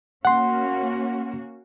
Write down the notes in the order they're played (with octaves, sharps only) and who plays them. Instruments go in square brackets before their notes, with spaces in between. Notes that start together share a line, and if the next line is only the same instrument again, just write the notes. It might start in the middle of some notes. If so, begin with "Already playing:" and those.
[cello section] A#3 C#4 F#4 [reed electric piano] F#5 C6